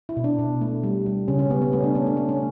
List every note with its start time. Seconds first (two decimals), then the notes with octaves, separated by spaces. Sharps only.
0.09 E4
0.17 B2
0.24 D4
0.39 B2
0.61 A3
0.83 G3
1.06 G3
1.28 C#3 C#4
1.39 C#4
1.50 G3 B3
1.62 B3
1.72 A3 C#4
1.83 D4
1.95 A3 C#4
2.06 D4
2.17 A3
2.29 C#4